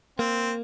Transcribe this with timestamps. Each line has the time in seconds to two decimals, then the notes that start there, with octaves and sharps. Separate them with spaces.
0.19 A#3 C4